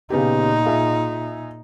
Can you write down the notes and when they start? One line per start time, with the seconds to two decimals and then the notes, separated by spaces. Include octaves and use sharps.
0.10 A#2 C#3 B3 D#4 G4
0.65 F4 G#4 E5